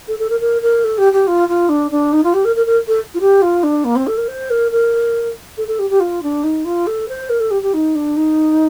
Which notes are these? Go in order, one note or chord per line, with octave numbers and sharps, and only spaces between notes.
A4
A4
A#4
A#4
A#4
A4
G4
G4
F4
F4
D4
D4
D#4
F4
G4
A#4
A#4
A#4
A4
F4
G4
F4
D4
A#3
C4
A4
A#4
C5
A#4
A#4
A4
A4
G4
G4
F4
D4
D#4
F4
A4
C5
A#4
A4
G4
G4
D#4
D4
D#4